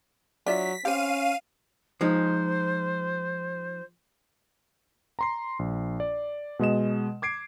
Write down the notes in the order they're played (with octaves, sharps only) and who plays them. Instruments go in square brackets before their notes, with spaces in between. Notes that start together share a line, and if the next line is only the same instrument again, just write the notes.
[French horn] F#3 [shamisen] D4 F4 E5 [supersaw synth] B6
[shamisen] C4 G4 [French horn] C#4 [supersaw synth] F5 D#7
[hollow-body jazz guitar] F3 G#3 D#4 [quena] C5
[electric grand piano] A#5 C6 C7
A#1
D5
B2 G#3 D#5 E7
D6 G#6 C7 D7